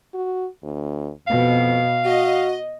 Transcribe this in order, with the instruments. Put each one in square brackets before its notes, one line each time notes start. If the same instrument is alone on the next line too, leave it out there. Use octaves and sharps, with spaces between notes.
[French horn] F#4
D2
[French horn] F2 [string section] B2 [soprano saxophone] F5
[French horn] F#4 [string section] D#5